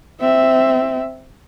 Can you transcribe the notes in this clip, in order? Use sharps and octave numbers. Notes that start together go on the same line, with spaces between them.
C4 E5